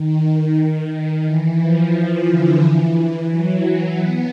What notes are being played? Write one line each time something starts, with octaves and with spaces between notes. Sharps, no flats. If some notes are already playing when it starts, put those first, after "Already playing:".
Already playing: D#3
E3
F3
D3
E3
F#3
B3